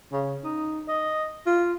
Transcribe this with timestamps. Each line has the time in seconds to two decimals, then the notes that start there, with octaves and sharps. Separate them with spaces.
0.12 C#3
0.44 D#4
0.88 D#5
1.47 F4